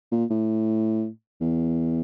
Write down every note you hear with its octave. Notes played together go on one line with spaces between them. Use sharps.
A#2
A2
E2